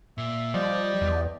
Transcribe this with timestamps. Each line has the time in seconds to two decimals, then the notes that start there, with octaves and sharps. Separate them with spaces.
0.18 A#2 E5
0.54 F3 G3 G4 D5 D#5
1.02 E2